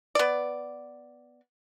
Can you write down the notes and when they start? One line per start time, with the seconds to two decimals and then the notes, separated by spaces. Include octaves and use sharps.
0.15 B3 D5